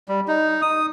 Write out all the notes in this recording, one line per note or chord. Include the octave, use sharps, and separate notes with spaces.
G3
D#4
D#6